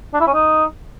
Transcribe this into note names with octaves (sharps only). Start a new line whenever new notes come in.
D4
E4
C#4
D#4